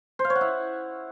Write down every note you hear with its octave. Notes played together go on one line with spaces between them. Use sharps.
C5
F5
C#5
F#5
E4